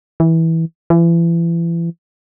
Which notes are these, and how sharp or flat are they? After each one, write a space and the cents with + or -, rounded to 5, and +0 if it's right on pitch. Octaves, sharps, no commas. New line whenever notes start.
E3 -15
E3 +35